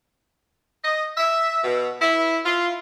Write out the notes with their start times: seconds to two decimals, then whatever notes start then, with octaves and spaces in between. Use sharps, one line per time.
0.84 D#5
1.17 E5
1.64 B2
2.00 E4
2.45 F4